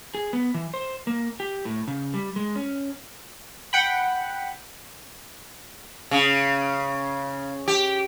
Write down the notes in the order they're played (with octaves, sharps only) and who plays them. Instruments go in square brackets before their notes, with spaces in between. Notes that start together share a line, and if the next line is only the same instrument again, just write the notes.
[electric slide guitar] G#4
B3
E3
C5
A#3
G4
A2
C#3
G3
G#3
C#4
[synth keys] F#5 G5 B5
[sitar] C#3
G4